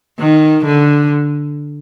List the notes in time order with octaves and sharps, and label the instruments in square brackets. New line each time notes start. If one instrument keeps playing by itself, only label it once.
[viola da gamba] D#3
D3